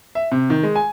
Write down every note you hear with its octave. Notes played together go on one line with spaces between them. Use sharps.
E5
C3
D#3
G#3
G#5